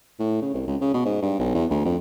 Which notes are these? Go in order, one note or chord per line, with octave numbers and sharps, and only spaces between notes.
A2
C#3
C2
C#2
C#3
B2
G#2
G2
B1
E2
D2
F2